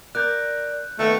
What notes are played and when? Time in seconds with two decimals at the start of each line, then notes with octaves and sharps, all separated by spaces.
0.15 A#4 D5 F#6 G6
0.99 D#3 A3 B3 F5